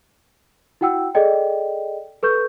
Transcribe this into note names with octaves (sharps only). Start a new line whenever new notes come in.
E4 F#4 F#5 G5 E6
G#4 A4 D5 D#5 G5
A4 B4 C#6 G6